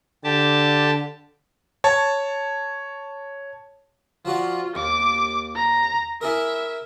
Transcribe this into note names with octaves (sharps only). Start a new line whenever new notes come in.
D3 G4 A5
C#5 A5
F3 F4 F#4 D5
D#2 D6
A#5
E4 G#4 A#4 E5